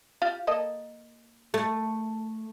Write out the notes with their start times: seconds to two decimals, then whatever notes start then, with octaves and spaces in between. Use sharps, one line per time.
0.22 F4 G4 F5
0.47 A#3 A4 D#5
1.54 A3